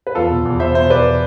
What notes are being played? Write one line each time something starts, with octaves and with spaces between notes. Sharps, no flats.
B4
E2 F4 A4
B2
E2
B2 C5 E5
B2 C5 E5
E2 B4 D5